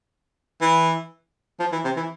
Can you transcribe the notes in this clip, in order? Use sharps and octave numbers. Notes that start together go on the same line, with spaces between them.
E3
F3
E3
C3
E3